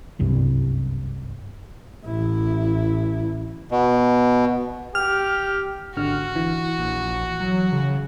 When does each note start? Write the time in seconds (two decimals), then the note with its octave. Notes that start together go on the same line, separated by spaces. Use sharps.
0.19 F#1 C2 G2
2.05 A1 E4
3.72 B2
4.95 G4 F6
5.97 G#1 D3 F#4 F6
6.36 E3
6.78 A#1
7.40 F#3
7.72 C#3